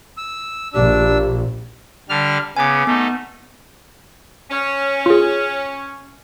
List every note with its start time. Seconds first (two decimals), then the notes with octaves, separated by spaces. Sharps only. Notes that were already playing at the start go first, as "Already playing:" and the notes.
0.18 E6
0.74 A#1 D4 G4 E6
2.09 D3 G3 F6
2.57 C#3 B3 G#5 D6
2.87 A3 B3 D#4
4.51 C#4
5.06 F4 G#4